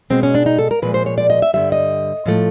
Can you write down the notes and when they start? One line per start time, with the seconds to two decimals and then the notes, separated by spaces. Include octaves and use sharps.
0.10 B2 G#3 C4
0.23 C#4
0.34 D4
0.46 D#4
0.58 A4
0.71 A#4
0.82 A#2 F3 G#3 B4
0.94 C5
1.06 C#5
1.18 D5
1.30 D#5
1.42 E5
1.54 G2 D3 G3 E5
1.72 D#5
2.26 A2 F3 A3